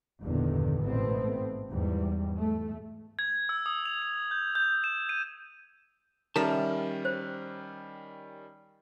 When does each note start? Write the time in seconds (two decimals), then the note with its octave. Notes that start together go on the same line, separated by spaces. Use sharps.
0.22 G1 E2 A#2 D3 D#3
0.82 A1 G#2 B2 A3 B3 C4
1.70 E2 G#2 E3 G3
2.37 A3
3.19 G#6
3.49 E6
3.66 D#6
3.86 F7
4.02 F7
4.31 G6
4.55 G6
4.84 E7
5.09 D#7
6.36 D#3 G3 C#4 A4 A#4 E5 A5
7.05 C5